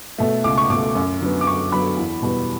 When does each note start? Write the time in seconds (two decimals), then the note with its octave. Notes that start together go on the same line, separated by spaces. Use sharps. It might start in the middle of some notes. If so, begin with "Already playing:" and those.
0.18 B2 A3
0.44 C#2 D6
0.58 C#6
0.70 B2 A3 D6
0.95 F#2
1.21 D3 F#3 B3
1.41 D6
1.46 F#2 C#6
1.71 D3 F#3 B3 B5
1.97 E2
2.23 B2 G3 B3